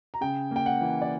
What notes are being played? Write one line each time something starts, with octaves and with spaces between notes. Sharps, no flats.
A#5
C#3 G5
A#3 G5
F#5
E3
D5